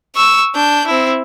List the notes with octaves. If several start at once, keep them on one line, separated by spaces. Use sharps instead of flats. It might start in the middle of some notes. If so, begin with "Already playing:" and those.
C#6 E6
D4 G6
C4 E4